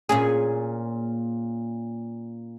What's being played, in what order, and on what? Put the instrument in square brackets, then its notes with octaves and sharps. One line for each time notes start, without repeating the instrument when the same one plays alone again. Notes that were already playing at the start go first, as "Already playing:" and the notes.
[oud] A#2 C#4 G#4